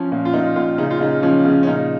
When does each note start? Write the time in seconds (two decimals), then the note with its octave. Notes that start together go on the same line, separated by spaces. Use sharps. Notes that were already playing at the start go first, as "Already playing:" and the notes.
Already playing: F3 C#4
0.12 A#2
0.25 F4
0.34 A#2 D#4
0.56 A#2 F4
0.78 C#3 D#4
0.90 F4
1.00 C#3 D#4
1.23 F3 C#4
1.45 C#3
1.63 C#4
1.67 A#2 D#4